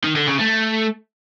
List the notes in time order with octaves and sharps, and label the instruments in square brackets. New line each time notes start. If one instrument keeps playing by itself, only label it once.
[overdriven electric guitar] D#3
D3
C#3
A3